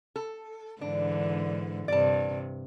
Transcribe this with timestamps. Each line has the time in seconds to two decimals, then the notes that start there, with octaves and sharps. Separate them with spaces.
0.16 A4
0.81 G#2 D3 E3 D4
1.88 G2 C3 D5 A5